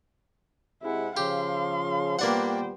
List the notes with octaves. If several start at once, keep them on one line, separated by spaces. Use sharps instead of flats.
C3 G#3 E4 F#5
C#3 F3 G4 F5 C6
A#2 G3 A#3 B3 D4 C5 F#5 G5